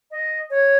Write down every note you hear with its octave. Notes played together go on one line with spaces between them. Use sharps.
D#5
C#5